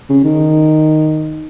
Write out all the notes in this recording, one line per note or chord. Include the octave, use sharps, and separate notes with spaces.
C#3
D#3